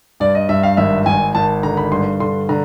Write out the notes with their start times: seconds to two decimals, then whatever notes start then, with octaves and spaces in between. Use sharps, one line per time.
0.20 G2 D5
0.35 D#5
0.49 G2 E5
0.63 F5
0.77 G#1 E5
1.06 G#1 G#5
1.35 G#1 A5
1.63 D3 A#5
1.77 B5
1.92 G2 C6
2.20 D3 C6
2.49 D3 A#5